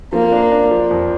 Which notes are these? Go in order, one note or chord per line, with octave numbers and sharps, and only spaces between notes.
F3 A#3
D4
D4
F3
F2